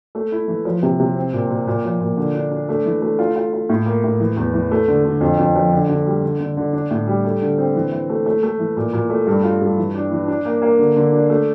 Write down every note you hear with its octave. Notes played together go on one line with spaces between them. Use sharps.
A3
E4
E3
F3
C3
C3
C4
A#2
A#2
A#2
F3
A#2
D3
D4
D4
A3
E3
A3
F4
F4
F4
A2
A#3
A2
E3
E2
E3
A3
D3
D3
F2
F2
F3
D3
D3
G3
D3
D3
D3
D4
A2
G3
A3
D3
C4
E3
E3
A3
A3
A3
E3
A#2
A#2
A3
G2
F4
G2
E3
D4
E3
D4
A#3
A#3
D3
D3
D4
A3